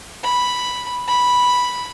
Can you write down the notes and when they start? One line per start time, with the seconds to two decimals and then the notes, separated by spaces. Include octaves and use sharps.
0.24 B5
1.08 B5